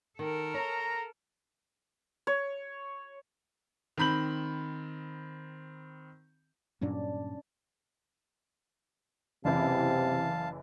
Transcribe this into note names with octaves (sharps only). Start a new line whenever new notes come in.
D#3 A4 A#4
C#5 A#5
C#5
D#3 C4 B5 G6 F#7
G2 A#2 F#3 C#4 D4 D5
F#1 C3 E3 E4 F5 A5